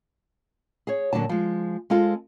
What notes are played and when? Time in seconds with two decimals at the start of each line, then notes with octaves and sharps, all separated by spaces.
0.87 G#4 C#5
1.13 A#2 D3 F#3 D4 A5
1.29 F3 G#3
1.90 G#3 C4 F4 A4